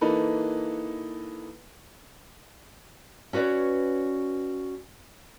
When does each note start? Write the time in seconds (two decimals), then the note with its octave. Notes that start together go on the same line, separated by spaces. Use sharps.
0.01 E3 A#3 D#4 A4 B4
3.33 C#4 F#4 B4 C#5 D5